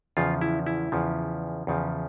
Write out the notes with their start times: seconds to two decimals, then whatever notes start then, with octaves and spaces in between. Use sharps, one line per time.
0.17 E2 C#3 F3 F4
0.41 E4
0.66 E4
0.92 E2 C#3 F3
1.67 E2 C#3 F3